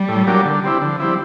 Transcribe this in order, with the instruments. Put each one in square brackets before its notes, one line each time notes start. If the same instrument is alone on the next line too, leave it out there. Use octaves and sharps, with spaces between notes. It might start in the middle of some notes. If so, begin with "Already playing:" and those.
Already playing: [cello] G3
[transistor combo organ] A2
F#3 A#3 D4 G4
D3
G3 C4 E4
[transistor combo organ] D3 [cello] F3
[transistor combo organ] G3 C4 E4